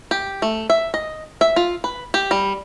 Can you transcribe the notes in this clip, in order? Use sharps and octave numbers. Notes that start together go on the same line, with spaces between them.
G4
A3
E5
D#5
E5
F4
B4
G4
G3